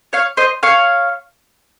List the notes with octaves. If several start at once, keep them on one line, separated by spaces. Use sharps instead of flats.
C#5 F5
C5 D#5
C#5 F5